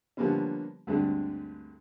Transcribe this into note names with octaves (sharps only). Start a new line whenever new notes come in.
D3 F3 G3 A#3 B3 C#4
D2 G2 D3 G#3 C4 D4